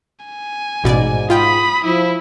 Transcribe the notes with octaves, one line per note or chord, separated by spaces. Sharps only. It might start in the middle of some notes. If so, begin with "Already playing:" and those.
G#5
A1 G#2 B2 D5
F4 G5 B5 D#6
F3 E4